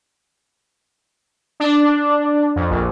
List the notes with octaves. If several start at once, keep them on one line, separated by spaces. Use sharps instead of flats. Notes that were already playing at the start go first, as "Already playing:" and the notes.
D4
F2
A#1